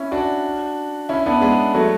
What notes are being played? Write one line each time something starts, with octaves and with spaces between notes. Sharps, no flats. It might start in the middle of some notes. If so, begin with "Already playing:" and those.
Already playing: C#4 E4
D4 F#4
C#4 E4
B3 D4
G#3 B3
F#3 A3